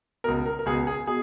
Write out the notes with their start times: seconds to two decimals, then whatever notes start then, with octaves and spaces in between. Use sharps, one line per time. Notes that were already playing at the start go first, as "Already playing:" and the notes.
0.24 C#2 B2 A#4
0.46 A#4
0.59 A#4
0.66 C#2 B2 G#4
0.87 G#4
1.07 B2 G#4